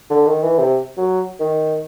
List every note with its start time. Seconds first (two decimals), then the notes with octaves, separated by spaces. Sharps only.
0.10 D3
0.27 D#3
0.43 E3
0.59 C3
0.97 F#3
1.40 D#3